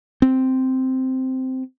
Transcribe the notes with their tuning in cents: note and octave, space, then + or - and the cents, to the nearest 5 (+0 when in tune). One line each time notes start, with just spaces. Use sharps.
C4 -5